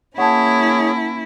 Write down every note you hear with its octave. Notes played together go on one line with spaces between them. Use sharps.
A#3 C#4 E4 G#4 C#5 F#5 A5